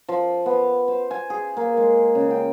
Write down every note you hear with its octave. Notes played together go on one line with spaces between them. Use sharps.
F3
B3
C5
G#5
G#4
A#3
G#3
C#3
G5